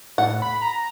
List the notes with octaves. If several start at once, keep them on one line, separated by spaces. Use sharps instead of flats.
A2 F#5
B5
A#5